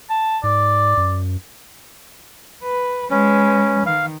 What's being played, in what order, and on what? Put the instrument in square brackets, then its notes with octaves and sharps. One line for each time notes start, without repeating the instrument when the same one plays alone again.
[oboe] A5
[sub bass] G#2 [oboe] D5
[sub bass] F#2
[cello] B4
[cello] G#3 B4 [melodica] C#4
[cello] D#3 [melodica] F5